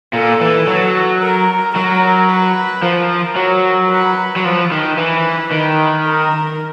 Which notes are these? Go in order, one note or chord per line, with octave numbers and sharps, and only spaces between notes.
A#2 A4
E3
F#3
A#4
F#3 A#4
B4
F3 A#4
F#3
B4
F#3
F3 B4
D#3
E3
D#3
A#4